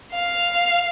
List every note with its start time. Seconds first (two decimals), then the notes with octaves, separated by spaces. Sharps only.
0.13 F5